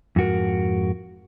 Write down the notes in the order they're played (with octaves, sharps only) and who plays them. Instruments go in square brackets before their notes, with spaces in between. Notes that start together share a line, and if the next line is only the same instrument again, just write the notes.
[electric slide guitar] F2 G#2 F#4 A#4